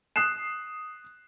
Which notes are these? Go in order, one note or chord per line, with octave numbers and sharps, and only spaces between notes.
D#6 F#6 C7 E7